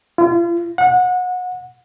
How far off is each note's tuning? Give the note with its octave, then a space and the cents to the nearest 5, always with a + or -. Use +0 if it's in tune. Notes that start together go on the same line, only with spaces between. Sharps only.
F4 -35
F#5 -25